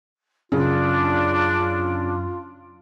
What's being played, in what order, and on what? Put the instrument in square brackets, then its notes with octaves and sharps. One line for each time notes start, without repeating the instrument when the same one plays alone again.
[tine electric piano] F#2 [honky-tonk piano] C#3 [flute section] D4 [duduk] F4